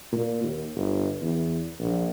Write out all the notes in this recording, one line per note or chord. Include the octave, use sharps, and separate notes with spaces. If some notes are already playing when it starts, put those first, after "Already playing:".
A#2
D#2
G1
E2
A#1